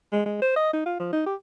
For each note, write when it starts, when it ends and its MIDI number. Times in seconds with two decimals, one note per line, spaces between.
0.12 0.24 56
0.26 0.38 56
0.42 0.54 72
0.56 0.71 75
0.73 0.82 63
0.86 0.96 65
1.00 1.10 53
1.13 1.25 63
1.26 1.35 67